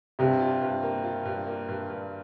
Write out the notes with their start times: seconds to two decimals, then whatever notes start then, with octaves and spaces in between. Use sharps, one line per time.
0.19 G2 C3
0.40 F4
0.61 G2
0.83 A#3
1.04 F4
1.25 G2
1.46 A#3
1.69 G2
1.90 G2